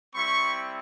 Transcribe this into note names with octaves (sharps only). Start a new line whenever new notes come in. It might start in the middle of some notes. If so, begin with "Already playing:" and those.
G3 C4 E4 B5 C#6